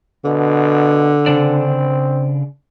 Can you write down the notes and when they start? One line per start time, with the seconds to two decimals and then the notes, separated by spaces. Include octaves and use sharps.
0.25 B2 D3
1.26 C#3 C4 D4 D5